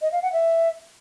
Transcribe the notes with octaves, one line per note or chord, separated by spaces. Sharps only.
D#5
F5
F#5
E5